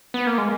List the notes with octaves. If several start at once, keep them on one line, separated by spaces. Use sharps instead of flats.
B3
A#3
G#3